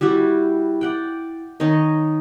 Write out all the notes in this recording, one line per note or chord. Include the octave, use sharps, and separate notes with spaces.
G3 E4 F#4 G4
D5 F#5 G5
D#3 D#4 C#5 D#5